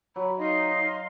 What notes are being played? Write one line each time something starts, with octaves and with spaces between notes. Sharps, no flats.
F#3 B5
D#4 D#5 F5 C6